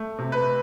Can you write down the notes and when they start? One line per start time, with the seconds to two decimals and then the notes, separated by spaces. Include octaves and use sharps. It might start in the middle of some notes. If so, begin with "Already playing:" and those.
Already playing: A3
0.18 C3
0.32 B4